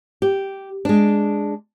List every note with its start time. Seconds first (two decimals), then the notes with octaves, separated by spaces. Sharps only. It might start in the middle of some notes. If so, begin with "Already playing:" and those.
0.22 G4
0.85 G#3 D4